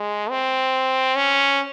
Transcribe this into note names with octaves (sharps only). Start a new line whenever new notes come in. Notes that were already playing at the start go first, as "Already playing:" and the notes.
Already playing: G#3
C4
C#4